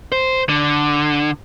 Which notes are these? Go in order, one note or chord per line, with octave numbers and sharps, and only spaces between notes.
C5
D3